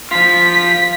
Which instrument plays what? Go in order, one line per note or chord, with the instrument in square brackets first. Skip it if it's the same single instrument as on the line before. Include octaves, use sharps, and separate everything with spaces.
[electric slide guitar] F3 F4 [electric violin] B6